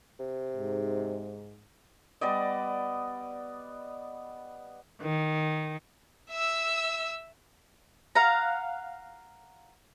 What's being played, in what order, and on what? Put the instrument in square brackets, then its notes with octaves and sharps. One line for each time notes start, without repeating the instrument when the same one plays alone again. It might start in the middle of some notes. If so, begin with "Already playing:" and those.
[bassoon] C3
[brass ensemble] G#2
[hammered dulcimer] G3 B3 D5 D#5
[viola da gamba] D#3
[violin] E5 E6
[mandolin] F5 F#5 A#5